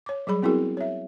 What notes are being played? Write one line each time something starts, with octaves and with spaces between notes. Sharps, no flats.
C#5 D6
F#3 G3 G#4 B5
B3 C4 E4 F#4 G#4 A#4
C#5 E5